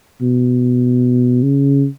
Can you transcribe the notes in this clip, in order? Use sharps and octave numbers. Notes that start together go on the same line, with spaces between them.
B2
C#3